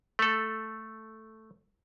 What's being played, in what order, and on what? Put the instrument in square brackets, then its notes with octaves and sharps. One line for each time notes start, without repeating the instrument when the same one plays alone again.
[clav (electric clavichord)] A3 A4